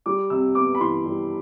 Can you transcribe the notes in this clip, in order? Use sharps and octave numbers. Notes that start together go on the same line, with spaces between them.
G3 D6
C3 E6
B3 D6
B5
E3 C6
G3